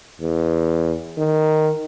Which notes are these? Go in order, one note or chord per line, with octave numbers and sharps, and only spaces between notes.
E2
D#3